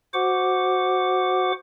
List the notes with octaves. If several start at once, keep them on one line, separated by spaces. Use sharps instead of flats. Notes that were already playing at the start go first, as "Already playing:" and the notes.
F#4 C5 F#5 D6